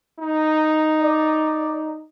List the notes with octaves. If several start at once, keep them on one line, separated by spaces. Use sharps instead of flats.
D#4
D5